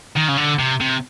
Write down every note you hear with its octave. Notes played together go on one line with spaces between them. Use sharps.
D#3
C#3
D3
C3
C3